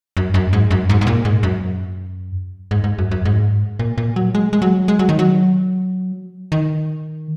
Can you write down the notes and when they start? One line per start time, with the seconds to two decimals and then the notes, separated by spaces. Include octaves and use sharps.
0.17 F#2
0.34 F#2
0.53 G#2
0.71 F#2
0.90 G#2
1.01 G#2
1.07 A#2
1.25 G#2
1.43 F#2
2.71 G#2
2.84 G#2
2.98 F#2
3.11 F#2
3.25 G#2
3.79 A#2
3.98 A#2
4.16 F#3
4.35 G#3
4.53 G#3
4.62 F#3
4.88 G#3
4.99 F#3
5.09 D#3
5.19 F#3
6.52 D#3